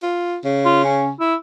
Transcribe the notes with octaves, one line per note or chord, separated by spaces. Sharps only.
F4
C#3
F4
C#4
E4